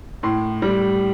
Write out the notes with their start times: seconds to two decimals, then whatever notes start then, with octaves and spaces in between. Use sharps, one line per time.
0.23 A2 C6
0.62 G3